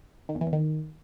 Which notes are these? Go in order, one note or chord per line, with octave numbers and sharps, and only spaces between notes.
D#3
E2
E3
E2
D#3